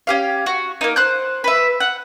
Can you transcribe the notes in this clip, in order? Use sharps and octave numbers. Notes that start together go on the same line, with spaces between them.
C#4 G4 F5
F#4
A#3 D#4
C5 F#6 G6
B4 E5
F#5